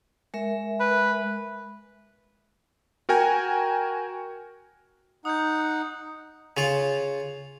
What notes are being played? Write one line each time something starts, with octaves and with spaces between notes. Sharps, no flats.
G#3 A#4 E5
B4
F#4 A#4 G5 G#5
D#4 F#5 D#6 G6
C#3 F4